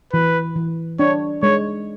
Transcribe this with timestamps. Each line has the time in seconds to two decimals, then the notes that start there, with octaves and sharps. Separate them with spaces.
0.13 E3 B4
0.56 E3
0.99 D4 C#5
1.42 G#3 C#5